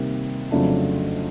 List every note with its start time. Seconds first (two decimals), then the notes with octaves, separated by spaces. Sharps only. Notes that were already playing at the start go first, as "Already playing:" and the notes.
Already playing: C3 D#3 G3 A#3
0.51 F2 C#3 F#3 A3 D4